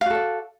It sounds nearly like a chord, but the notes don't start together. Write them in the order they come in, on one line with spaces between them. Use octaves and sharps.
F5 F#4 A4 D5